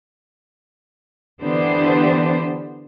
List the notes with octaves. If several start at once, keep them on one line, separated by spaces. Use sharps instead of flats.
D3 E3 B3 D4 G4 C5